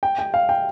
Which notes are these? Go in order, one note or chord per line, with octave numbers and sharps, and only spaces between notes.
G5
G5
F5
G5